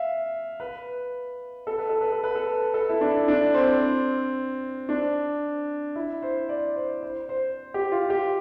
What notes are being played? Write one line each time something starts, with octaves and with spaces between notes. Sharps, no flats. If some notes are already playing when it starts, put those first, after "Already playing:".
Already playing: E5 F5
B4
A4
B4
A4
B4
A4
B4
A4
A4
E4
D4
D4
C4
D4
E4
C5
D5
C5
C5
C5
G4
F4
G4